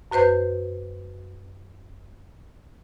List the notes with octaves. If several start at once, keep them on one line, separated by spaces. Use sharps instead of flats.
F#2 F#4 B4 C5 G6